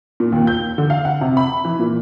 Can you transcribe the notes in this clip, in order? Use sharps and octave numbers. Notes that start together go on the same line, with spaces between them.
A#2
D#2
G6
D3
F5
F#5
C3
B5
E3
A#2